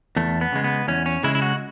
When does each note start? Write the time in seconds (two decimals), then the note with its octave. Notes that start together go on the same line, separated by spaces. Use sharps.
0.16 E2 A3
0.41 B3
0.52 C#3 G#3
0.64 B3
0.88 E2 C#4
1.06 C#4
1.23 C#3 G#3 E4
1.35 E4
1.42 F#4